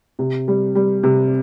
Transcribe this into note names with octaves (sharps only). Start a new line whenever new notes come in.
C3
G3
G3
C3